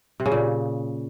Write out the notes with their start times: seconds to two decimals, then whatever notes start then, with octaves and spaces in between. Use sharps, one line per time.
0.20 C3
0.26 C#3
0.32 A#2